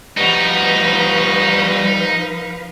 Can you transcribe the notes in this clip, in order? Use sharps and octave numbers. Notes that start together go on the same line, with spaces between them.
F3 G3 D#4 F#4 B4 F5